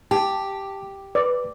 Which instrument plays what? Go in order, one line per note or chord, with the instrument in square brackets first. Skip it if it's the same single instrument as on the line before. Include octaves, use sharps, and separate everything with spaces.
[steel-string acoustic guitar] G4 [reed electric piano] A5
[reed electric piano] B4 [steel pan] D5